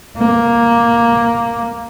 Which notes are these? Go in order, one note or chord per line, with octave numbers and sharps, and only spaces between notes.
A#3